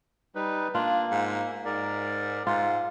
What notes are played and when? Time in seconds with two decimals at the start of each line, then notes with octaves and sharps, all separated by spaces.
0.35 G3 D#4 B4
0.75 A#3 D4 F4
1.11 G#2
1.65 G#2 A#4 D5
2.47 G#2 F4